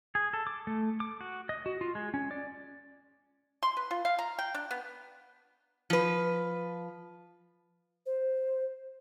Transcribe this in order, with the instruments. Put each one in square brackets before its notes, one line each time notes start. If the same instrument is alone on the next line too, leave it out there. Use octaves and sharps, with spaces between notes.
[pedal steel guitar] G#4
A4
D6
A3
D6
F#4
D#5
F#4
F4
G#3
C#4
D5
[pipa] C6
B4
F4
F5
A#5
G5
D4
B3
[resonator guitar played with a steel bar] F3 B4
[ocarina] C5